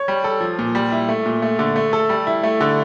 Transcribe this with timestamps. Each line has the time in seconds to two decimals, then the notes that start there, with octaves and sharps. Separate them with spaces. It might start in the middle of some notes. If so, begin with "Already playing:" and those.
Already playing: C#5
0.08 G3
0.24 A4
0.41 F3
0.59 A#2
0.75 G3
0.92 E4
1.09 A3
1.26 A#2
1.42 A3
1.59 D3
1.76 A3
1.93 A4
2.09 G3
2.27 E4
2.43 A3
2.61 D3